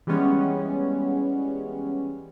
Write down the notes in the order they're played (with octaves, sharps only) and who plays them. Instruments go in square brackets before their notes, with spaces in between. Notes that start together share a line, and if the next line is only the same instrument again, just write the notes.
[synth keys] E3 G3 G#3 B3 C#4